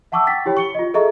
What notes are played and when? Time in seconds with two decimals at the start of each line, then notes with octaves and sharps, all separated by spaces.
0.12 E5 F#5 A5 C#6 D6 E6
0.26 F#5 G5 A6 B6
0.46 E4 G4 C#5 G5 B5
0.57 C#6 C#7 G7
0.75 F4 D#5
0.94 G#4 A4 D#5 E5 A#5 C#6